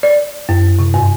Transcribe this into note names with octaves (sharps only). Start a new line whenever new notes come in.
D5
F#2
C3
G2